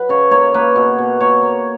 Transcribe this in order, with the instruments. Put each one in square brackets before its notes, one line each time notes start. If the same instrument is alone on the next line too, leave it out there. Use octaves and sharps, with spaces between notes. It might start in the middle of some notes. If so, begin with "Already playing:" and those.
Already playing: [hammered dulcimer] F#3 B4
C#3 C#5
A#3 C#5
A#3 B4
B2
B2
A#3 C#5
A#3